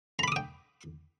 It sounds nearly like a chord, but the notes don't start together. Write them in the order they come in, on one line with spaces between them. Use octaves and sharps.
A#5 B5 D6 D#6 G5